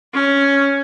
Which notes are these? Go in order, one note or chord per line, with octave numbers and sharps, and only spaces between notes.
C#4